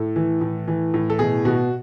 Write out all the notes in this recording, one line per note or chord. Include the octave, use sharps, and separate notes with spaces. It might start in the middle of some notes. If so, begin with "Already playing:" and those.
Already playing: A2 A4
E3
A2
E3
A2
A4
B2 G#4
B2 F#4